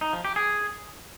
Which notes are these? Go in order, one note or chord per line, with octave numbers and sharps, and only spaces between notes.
D#4
F3
G4
G#4